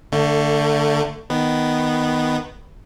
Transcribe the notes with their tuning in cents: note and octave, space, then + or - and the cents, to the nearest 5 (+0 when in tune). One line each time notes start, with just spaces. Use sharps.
D3 +0 A3 +25
D#3 +0 B3 +0